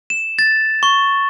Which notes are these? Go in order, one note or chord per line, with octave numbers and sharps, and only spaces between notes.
E7
A6
C#6